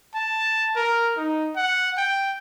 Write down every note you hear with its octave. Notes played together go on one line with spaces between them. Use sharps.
A5
A#4
D#4
F#5
G5